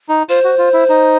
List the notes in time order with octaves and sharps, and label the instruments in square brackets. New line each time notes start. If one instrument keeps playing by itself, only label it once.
[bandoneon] D#4
[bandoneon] F4 [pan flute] C5
[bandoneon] F#4
F4
E4
D#4